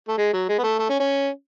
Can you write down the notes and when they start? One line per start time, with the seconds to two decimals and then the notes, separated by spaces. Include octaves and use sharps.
0.08 A3
0.18 G#3
0.33 F#3
0.49 G#3
0.59 B3
0.63 A3
0.79 A3
0.89 C#4
1.00 C#4